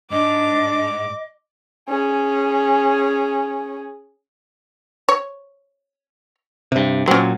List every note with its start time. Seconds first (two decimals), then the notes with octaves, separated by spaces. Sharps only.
0.11 G#2 D4 D#5 D6
1.89 C#4 G#4
5.09 C#5
6.72 G2 C3
7.08 A#2 F#3 C4 C#4